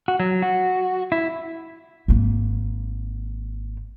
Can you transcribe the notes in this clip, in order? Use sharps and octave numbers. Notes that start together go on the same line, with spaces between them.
F#4
F#3
F#4
E4
G#1 A#3